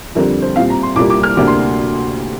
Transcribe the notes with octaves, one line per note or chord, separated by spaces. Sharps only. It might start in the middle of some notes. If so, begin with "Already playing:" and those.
F2 D3 G3 C4 A#4
C5
A#2 G3 C4 F5
A#5
C6
C2 A#2 G3 A#3 D6
D6
F6
D2 C3 A#3 D4 D6
C6